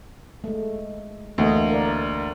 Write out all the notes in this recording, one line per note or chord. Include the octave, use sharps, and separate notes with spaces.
G#3 A3
D2 E3 A#3 D#5
A#4 D5